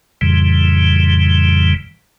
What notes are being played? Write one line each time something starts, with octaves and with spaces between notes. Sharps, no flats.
F2 A2 C#3 E3 G3